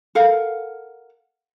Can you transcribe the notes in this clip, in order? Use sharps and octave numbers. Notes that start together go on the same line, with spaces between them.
A4 A#4 F5 F#5